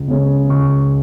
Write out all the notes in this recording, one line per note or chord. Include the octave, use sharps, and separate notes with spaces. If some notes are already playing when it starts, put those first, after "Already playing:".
Already playing: C#2
C#3 G#3 C#4
C#2 C#6